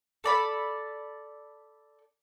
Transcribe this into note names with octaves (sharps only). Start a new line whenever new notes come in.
A4 D5 B5